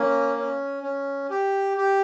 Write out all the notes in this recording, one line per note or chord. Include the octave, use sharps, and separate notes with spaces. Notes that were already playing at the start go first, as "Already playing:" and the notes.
Already playing: A#3 C#4
C#4
C#4
G4
G4